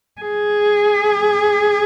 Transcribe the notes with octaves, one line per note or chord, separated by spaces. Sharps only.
G#4